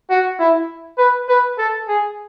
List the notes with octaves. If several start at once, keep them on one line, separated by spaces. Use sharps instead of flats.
F#4
E4
B4
B4
A4
G#4